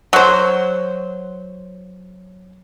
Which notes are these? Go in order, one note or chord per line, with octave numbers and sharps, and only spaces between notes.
F#3 C5